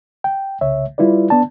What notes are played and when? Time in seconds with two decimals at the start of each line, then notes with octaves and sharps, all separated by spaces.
0.24 G5
0.61 C2 C#3 C#5 E5
0.98 G3 E4 F4 B4 D5
1.30 B3 D4 D5 A5